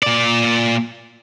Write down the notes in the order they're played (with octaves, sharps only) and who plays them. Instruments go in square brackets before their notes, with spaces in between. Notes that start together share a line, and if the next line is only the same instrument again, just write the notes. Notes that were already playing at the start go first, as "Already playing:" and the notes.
[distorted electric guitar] A#2 D5